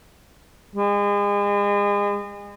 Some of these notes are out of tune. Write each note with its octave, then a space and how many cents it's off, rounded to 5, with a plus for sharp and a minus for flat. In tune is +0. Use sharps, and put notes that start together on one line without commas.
G#3 -35